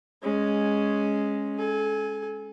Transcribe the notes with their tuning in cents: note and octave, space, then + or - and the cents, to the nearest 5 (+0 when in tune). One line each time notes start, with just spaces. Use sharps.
G#3 +0 C#4 +0
A4 -30 G#5 +0